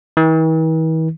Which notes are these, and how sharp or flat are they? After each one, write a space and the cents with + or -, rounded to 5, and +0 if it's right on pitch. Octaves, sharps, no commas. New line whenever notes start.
E3 -45